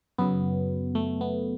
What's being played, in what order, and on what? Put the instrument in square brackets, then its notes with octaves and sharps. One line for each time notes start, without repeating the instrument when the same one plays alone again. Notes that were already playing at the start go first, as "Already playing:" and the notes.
[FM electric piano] F#2 C#3 F#3 B3
A3
B3